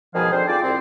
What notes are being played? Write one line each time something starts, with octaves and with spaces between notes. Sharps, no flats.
G#2 B2 D#3 F3 G#4 F5
C4 D4 A4 C5
C4 F4 G#4 D5
C2 C4